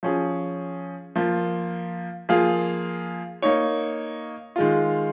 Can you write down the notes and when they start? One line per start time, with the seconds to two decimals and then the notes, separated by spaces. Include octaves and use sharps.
0.03 F3 C#4 G#4
1.15 F3 A#3 F4
2.29 F3 A#3 F4 G#4 F5
3.42 A#3 D#4 C#5
4.56 D#3 G#3 F4